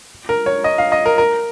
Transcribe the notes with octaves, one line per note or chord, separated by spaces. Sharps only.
A#4
C#5
D#5
F5
D#5
A#4
A#4